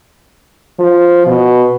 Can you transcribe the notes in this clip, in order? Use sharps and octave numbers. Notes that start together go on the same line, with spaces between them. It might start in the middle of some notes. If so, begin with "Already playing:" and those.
F3
B2